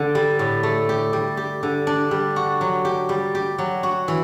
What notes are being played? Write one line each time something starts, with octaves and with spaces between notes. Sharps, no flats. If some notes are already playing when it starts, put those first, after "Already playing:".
Already playing: D3
G3
A2
A3
G4
G3
G4
D3
D4
G3
F#4
F#3
G4
G3
G4
F#3
F#4
E3